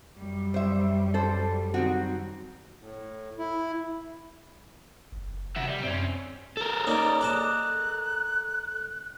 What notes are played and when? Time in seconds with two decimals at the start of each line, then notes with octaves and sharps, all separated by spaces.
0.14 F#2 G3
0.54 C5 E5
1.14 A4 C5
1.74 D#3 C4 F#4
2.81 A2
3.38 E4
5.12 F#1
5.56 C3 F#4 E5
5.68 G3
5.83 F#2 C4 C#4
6.57 A4 A#4
6.87 A#3 C#4 D#4 D5
7.21 D5 D#5 A5 F#6